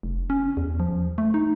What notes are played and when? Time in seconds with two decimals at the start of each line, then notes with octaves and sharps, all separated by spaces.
0.03 F1
0.30 C#4
0.57 E2
0.80 F3
1.18 A3
1.34 D#4